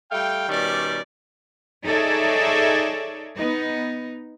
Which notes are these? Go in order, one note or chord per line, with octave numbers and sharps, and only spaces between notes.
G3 A3 F5 G5
B2 D#3 G3 C#4 D5
D#4 G#4 A4 C#5 D5 E5
B3 D#4